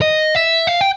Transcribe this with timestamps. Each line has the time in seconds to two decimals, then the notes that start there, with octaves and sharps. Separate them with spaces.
0.02 D#5
0.35 E5
0.67 F5
0.81 G5